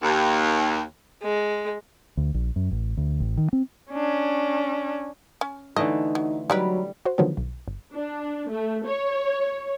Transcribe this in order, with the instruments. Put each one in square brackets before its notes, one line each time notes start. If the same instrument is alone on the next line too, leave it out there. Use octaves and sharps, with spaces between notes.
[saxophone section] D#2
[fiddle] G#3
[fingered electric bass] D2
A#1
F#2
A1
D2
A1
D#3
C4
[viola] C#4 D4
[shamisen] C#4
[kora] D3 E3 A3 [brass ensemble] D#4 [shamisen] D#5
[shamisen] F#3
[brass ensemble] F#3 [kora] G3 [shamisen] D#4 E4 B4
[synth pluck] F#4 C5
D3 D#3 F3 F#3 G#3 B3
B1
G1
[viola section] D4
A3
C#5